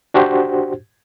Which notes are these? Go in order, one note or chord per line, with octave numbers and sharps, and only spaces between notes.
D4 F#4 G4 C5